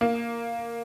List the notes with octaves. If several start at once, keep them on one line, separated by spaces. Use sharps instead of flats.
A#3